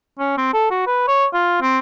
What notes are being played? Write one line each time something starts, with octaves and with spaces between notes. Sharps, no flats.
C#4
C4
A4
F#4
B4
C#5
F4
C4